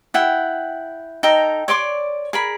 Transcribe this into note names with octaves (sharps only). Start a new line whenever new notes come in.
E4 F#5 G5
D#4 A4 G5 A#5
C#5 D5 C6 D6
G#4 A#4 B5